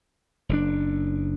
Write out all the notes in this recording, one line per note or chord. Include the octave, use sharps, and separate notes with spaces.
F#1 C#3 D4